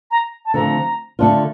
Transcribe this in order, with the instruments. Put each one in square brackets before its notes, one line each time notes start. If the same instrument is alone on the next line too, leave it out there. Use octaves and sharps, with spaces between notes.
[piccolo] A#5
A5
[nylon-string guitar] D3 F3 A3 C4 [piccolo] A#5
[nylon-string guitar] D3 A3 D4 F4